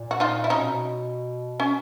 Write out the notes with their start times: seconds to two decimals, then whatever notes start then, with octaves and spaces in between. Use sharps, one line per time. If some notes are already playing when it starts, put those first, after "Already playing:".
Already playing: A#2
0.11 F#4
0.20 D#4 F4
0.44 E4
0.50 B2 C#4 D#4
1.60 C#4